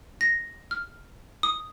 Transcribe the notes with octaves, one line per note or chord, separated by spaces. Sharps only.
A#6
F6
D#6